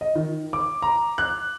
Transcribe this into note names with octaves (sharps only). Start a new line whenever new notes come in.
D#5
D#3
D6
A#5
F#6